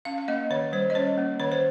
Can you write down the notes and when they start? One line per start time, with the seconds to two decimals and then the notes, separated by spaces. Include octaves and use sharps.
0.05 C#4 F5
0.18 F5
0.28 A#3 D#5
0.50 D#3 C#5
0.73 G3 C5
0.90 D#5
0.95 C#4 C#5
1.18 A#3
1.40 D#3 C#5
1.52 C5